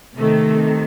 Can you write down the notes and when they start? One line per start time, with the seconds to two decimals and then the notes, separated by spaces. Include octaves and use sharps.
0.17 C3 D#3 A3